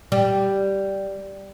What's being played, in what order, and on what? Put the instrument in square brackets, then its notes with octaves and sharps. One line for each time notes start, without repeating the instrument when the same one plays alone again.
[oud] G3